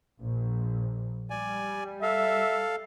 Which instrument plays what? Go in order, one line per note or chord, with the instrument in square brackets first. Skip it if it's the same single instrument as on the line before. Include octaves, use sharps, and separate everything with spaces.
[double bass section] A#1
[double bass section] G3 [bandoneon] D5 G#5
[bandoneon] A4 F5 [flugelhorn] E5